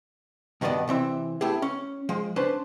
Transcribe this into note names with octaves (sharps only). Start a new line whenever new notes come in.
G2 B2 D#3 B3 D5 D#5
C3 E3 C4 E5
A3 B3 E4 G4 G#4
C#4
F3 G#3
C#4 D4 B4 C5 A5